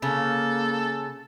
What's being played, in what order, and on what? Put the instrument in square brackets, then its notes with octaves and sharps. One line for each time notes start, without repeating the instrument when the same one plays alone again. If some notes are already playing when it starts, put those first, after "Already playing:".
[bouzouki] C#3 [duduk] A#3 [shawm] A4